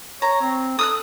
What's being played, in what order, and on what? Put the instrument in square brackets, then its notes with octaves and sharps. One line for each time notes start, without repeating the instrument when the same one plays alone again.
[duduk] C#5 [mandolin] A#5
[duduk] C4
[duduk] A4 [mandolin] D#6 E6 F#6